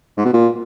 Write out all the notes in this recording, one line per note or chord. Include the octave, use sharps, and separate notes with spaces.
G#2
B2
A#2